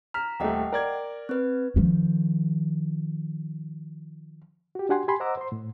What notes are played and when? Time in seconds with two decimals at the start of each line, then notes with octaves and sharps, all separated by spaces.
0.14 A#5 F6 B6
0.40 D#1 A3 D#5 F#5 G5
0.73 A#4 D5 G#6
1.29 C4 B4
1.76 D#3 F3
4.75 F#4 G4
4.89 D4 F#4 G4 F#5 G#5 C6
5.08 G4 G#5 B5 C6
5.20 C5 D#5 F#5 A#5 D6 E6
5.37 C5 C6
5.52 A2